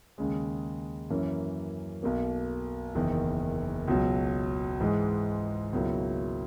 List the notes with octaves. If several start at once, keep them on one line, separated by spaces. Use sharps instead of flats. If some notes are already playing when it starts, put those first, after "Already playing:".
D#2 C#3 G#3
F#2 E3 A#3 C#4
B1 B2 A#3
F#1 E2 D#3
C#2 B2 F#3
G#2 E3 G#3
C#2 B2 F#3 A#3 E4